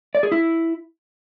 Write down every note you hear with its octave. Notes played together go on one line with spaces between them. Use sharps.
D5
G#4
E4